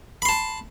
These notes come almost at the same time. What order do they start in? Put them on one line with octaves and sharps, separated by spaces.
B5 C6 A5